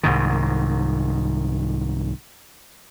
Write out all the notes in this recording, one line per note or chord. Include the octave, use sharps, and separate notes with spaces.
C2 G#2 D#3